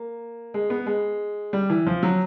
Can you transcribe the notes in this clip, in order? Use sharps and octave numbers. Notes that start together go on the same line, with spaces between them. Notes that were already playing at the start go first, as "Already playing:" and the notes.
Already playing: A#3
G#3
B3
G#3
G3
E3
F3
F#3